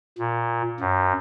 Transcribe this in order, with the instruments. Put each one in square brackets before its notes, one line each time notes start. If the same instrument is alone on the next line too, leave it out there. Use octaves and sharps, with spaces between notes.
[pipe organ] A#2
F#2